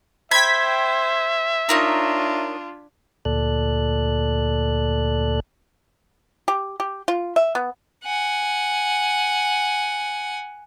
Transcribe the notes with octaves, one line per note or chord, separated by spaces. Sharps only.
C5 E5 G5 B5 G#6 B6
D4 D#4 F4 A#4 C#5
D2 A#2 A4 D5 F#6
G4
G4
F4
E5
B3
F#5 G#5